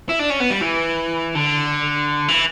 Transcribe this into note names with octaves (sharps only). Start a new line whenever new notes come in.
E4
D4
C#4
B3
G3
E3
D3
E3